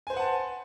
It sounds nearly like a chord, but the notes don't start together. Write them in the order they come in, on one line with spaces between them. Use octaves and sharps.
G#5 C5 B4 F#5 A5